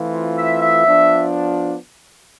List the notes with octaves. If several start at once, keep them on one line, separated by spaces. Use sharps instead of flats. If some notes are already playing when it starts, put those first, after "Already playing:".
Already playing: E3 A3 C4 F4
E5
E5
F3 B3 D4 F4